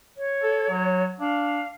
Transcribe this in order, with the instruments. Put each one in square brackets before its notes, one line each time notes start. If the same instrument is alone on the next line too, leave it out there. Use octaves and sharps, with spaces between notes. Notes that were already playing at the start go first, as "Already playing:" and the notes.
[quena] C#5
[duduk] A4
F#3
[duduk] D4 [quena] F5